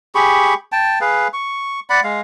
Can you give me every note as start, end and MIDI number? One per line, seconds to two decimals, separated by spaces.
0.15 0.54 67
0.15 0.54 68
0.15 0.54 83
0.15 0.54 85
0.72 0.99 79
0.72 0.99 81
1.01 1.28 68
1.01 1.28 71
1.01 1.28 77
1.33 1.80 85
1.90 2.00 74
1.90 2.00 78
1.90 2.00 83
2.04 2.21 56
2.04 2.21 77